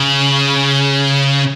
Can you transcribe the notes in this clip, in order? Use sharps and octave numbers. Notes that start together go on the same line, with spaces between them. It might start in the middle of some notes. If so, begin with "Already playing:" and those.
Already playing: C#3